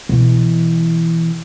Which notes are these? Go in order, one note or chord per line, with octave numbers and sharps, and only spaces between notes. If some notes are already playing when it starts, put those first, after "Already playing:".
B2 E3